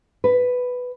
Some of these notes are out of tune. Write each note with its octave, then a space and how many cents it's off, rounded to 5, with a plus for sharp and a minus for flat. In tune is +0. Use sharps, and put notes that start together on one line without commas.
B4 +5